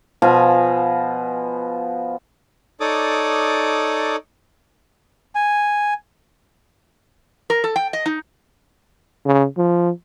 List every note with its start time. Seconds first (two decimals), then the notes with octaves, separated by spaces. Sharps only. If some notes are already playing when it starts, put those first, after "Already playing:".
0.22 B2 F3 F5 G#5
2.80 D#4 A4 C#5 D5 D6 D#6
5.35 G#5
7.50 A#4
7.64 A4
7.76 G5
7.93 D#5
8.06 D#4
9.26 C#3
9.57 F3